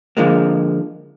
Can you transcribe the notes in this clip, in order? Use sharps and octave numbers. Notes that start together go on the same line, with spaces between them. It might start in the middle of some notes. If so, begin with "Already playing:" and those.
D3 F3 G#3 A#3